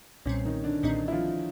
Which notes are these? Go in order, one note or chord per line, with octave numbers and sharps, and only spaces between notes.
B1 A#2 G3 C4 C#4
D#3 D#4
D3 D4
B1 A#2 D#3 G3 C4 D#4
E4
F3 F4